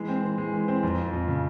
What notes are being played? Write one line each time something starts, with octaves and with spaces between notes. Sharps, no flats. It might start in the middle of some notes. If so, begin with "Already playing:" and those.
Already playing: E3 G#3
C4
E3
G#3
E3
C4
F2
F3
F2
C#3